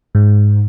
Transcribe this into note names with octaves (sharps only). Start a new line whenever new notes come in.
G#2